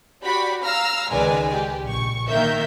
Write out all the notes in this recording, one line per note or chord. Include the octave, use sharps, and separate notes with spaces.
F#4 G4 D5 B5
F5 A#5 E6 F6
C#2 D#3 G#3 B4 D5 G#5
G4
A#1 C#6
D#3 A#3 A#4 E5 G6